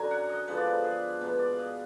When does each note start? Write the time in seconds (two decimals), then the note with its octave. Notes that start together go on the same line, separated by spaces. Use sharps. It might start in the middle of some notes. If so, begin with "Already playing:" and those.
Already playing: F#2 D3 F#3 G#5 A#5
0.11 F#5
0.29 D#5
0.47 D3 F3 G#3 B3 B4
0.57 D5
0.67 B4
0.84 G#4
1.21 B2 G#3 B3 B4
1.39 D5
1.53 F5
1.58 D#5